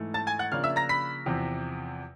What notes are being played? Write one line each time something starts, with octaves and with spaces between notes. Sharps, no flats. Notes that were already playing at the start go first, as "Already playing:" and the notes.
Already playing: G#2 E3 A3
A5 A6
G#5 G#6
F#5 F#6
C#3 F3 A#3 D4 F5 F6
E5 E6
A#5 A#6
B5 B6
E2 C3 F3